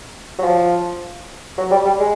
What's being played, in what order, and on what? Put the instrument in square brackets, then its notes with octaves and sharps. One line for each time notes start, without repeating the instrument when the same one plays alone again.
[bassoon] F#3
F3
F#3
G3
G3
G#3